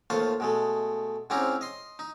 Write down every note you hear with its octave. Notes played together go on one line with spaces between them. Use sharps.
D#2 A3 F4 C5 C#6
B2 G#3 A3
G#2 C4 C#4 E4 G4 A#5
D#5 C6
D#4